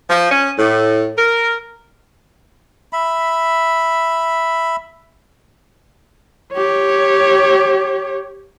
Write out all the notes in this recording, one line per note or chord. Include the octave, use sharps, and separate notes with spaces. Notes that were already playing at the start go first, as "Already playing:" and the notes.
F3
C#4
A2
A#4
E5 B5
G4 C#5